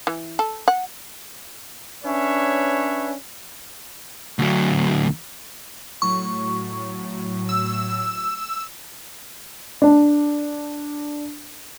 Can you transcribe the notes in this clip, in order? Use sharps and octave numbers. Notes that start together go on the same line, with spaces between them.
E3
A4
F#5
C#4 D4 B4 C#5 E5
D2 F#3
A2 F#3 C#6
E6
D4 A5